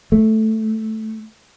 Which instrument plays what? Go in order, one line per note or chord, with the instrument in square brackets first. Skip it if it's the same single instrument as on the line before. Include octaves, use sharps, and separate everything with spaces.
[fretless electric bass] A3